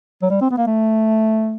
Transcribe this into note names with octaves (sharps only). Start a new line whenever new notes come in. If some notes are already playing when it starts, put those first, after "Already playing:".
F#3
G3
C4
B3
A#3
A3